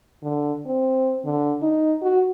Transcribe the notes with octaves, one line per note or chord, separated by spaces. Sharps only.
D3
C4
D3
D#4
F#4